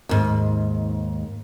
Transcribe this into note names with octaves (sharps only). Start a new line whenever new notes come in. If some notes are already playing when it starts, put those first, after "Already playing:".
D#2 G#2